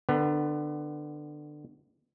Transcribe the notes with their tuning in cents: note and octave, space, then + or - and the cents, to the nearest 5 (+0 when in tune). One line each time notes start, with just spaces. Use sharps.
D3 +25 B3 +20 B4 -35